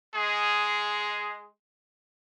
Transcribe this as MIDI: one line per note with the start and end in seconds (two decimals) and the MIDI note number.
0.15 1.49 56
0.15 1.49 68